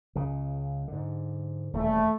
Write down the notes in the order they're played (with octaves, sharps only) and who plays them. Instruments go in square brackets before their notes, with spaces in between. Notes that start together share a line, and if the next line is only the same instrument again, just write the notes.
[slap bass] C#2 C#3
G#2 D3
[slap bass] D#1 E2 [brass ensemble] A3